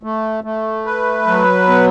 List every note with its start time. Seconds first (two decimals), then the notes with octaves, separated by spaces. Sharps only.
0.03 A3
0.44 A3
0.85 B4
1.26 F#3
1.67 B3